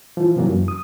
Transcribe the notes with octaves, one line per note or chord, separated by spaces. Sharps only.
E3 F3
G#2 C3 E3 F#3 A#3
F#2
D#6